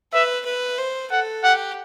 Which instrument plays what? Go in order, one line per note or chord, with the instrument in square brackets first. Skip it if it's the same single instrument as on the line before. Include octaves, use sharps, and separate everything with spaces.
[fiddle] B4 [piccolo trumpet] E5
[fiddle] B4
C5
[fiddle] A4 [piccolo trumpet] F#5
[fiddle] G4 [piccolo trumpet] F#5